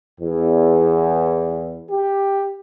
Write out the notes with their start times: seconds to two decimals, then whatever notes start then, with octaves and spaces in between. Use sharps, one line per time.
0.21 E2
1.90 G4